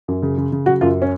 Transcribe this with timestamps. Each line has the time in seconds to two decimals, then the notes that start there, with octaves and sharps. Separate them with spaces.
0.08 F#2
0.22 C#3
0.38 C#3
0.52 C#3
0.66 F#3 F#4
0.81 F#2 F4
1.02 C#4